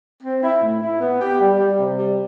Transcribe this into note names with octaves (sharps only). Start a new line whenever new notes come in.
C4
E4
A2
E4
B3
G4
G3
G3
C3
G3